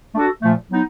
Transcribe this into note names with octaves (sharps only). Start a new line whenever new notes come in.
A3 D4 F#4 A4
A#2 F3 A3
F#3 B3 D#4